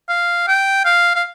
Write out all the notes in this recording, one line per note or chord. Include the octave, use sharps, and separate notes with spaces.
F5
G5
F5
F5